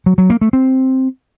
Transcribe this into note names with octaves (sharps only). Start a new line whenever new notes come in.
F#3
F#3
A#3
A3
C4